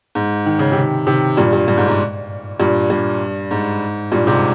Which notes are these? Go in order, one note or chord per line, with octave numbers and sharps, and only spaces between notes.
G#2
D#3
C#3
C3 D#3
C3 D#3
G2 A#2
G2
G2
G#2
G#2
G2 A#2
G2
G#2
G2 A#2
G#2 C3